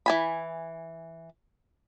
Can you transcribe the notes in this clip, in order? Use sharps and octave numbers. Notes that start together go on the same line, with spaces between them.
E3 G#5 B5